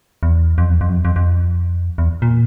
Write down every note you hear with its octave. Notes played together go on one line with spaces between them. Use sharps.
E2
F2
E2
F2
F#2
F2
F2
F2
E2
A#2